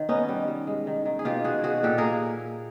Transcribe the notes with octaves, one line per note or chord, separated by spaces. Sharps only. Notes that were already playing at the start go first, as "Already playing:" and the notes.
Already playing: D#3
B3 C#4 D#4
G3
G3
G#3
D#3
D#3
G#4
B2 F4 G4
B2 F#4 G#4
B2 F#4 G#4
A#2 G4 A4
A#3 G#4 A#4